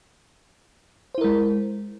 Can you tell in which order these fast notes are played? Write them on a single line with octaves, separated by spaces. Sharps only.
C5 E4 A#4 G#3